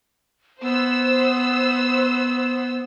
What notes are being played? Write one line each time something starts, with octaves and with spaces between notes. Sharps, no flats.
B3 C5 E6